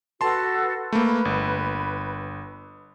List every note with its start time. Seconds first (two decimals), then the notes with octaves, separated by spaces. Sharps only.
0.21 F#4 A4 B4 A5 C6
0.92 A3 A#3 B4 B5
1.25 G1